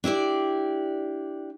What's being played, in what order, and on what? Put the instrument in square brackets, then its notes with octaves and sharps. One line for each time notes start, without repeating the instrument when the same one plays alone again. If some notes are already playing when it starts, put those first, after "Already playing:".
[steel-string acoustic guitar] D4 E4 G4 D5